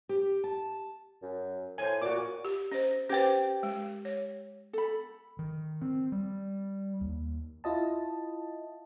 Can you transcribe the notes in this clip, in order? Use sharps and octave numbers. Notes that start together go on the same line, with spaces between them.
G4
A5
F#2
A2 C5 G#5
A#2 F#4 D6
G4
C#4 C5 D#5
C#4 G4 B4 C5 G5
G#3
C#5
A4 B5
D#3
C4
G3
D#2
E4 F4 D#5 A5